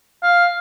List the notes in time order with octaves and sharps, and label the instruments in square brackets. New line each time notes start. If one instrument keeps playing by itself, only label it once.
[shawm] F5